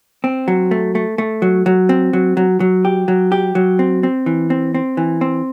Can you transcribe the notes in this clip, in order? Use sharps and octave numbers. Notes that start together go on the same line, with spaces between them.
C4
F#3
A3
A3
A3
F#3
F#3
C4
F#3
F#3
F#3
G4
F#3
G4
F#3
C4
C4
E3
C4
C4
E3
C4